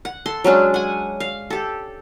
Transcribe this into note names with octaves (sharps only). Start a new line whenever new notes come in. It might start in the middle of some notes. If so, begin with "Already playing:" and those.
F#5
A4 C6
F#3 G#3 C#4 D4
F#5 G#5
F5
G4 A4